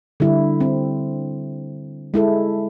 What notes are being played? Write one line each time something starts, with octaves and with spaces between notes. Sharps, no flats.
D3 G3 E4
C4
G#3 E4 A4